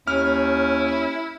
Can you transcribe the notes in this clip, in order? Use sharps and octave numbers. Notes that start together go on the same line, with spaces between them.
D#2 C#4 E4 F6